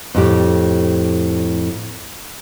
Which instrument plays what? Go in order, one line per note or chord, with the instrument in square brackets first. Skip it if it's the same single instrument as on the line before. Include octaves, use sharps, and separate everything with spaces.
[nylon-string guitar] F2 A2 G4